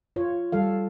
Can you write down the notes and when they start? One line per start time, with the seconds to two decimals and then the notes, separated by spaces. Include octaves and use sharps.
0.16 F4 C#5
0.52 G3 A4 F5